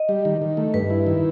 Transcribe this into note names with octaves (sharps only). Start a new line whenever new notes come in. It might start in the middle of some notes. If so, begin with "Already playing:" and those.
Already playing: D#5
G3
D#3
D#3
A3
G2 B4
E4
D#3